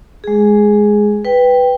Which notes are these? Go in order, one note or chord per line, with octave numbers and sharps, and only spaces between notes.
G#3 G#4
B4 G5